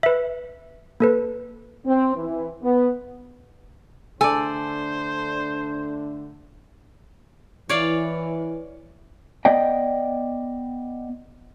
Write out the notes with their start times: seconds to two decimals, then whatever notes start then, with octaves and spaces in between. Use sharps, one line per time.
0.03 B4 E5
1.00 A#3 A4 B4
1.86 C4
2.15 E3
2.63 B3
4.21 D3 A3 D4 A4 C5 D5 G#5
7.69 E3 C#5 D5 F5
9.45 B3 D5 D#5 G5